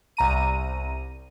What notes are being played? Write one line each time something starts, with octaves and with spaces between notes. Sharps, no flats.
C2 A#5 D#7